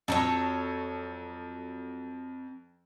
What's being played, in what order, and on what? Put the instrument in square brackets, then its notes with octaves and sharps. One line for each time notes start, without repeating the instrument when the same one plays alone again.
[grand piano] F2 [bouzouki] F#3 A4 C#5